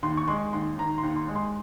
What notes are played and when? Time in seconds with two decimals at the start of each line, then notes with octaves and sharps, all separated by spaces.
0.03 D#2 C6
0.17 C#6
0.28 G#3 C6
0.53 D#2 C6
0.78 D#3 A#5
0.98 C6
1.03 D#2
1.16 C6
1.28 G#3
1.35 C6